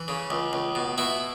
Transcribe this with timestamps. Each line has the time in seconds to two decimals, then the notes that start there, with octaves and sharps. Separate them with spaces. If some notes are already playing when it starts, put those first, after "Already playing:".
Already playing: E3
0.08 C#3
0.30 C#2
0.53 C#2
0.75 B2
0.98 B2 E4